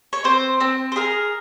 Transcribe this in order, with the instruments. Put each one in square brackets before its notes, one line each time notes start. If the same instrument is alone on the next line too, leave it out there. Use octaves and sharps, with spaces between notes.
[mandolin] C#5
C4 C5
C4
C5
G#4 A#4